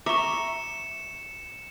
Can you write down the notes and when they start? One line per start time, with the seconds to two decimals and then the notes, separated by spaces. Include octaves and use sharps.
0.06 E5 A#5 C#6 D6 C#7 E7